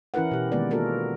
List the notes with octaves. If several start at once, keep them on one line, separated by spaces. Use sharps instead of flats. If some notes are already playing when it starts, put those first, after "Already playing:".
E3 C#4 E4 A#4 B4 F#5
B2 G4
D#3 G#3 A#3 B3 B4 D5
A#3 B3 F4 F#4 A4 A#4